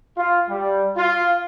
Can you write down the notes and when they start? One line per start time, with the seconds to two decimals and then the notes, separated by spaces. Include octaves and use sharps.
0.17 F4
0.49 G3
0.97 F4